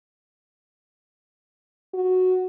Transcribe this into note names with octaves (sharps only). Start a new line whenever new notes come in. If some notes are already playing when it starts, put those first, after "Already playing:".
F#4